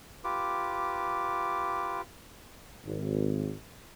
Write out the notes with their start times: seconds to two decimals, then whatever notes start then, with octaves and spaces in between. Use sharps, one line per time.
0.24 F4 G4 B4 D6
2.84 G#1